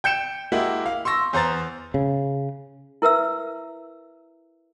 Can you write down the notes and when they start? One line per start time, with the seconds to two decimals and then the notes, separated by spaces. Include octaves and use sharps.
0.04 G5 G6 C#7 E7
0.52 G#3 A#3 E4 F#4 G4 F#5
0.86 F5
1.05 C6 C#6 E6 A#6
1.33 E2 C5 A#5 A6
1.94 C#3
3.02 E4 A#4 B4 E5 E6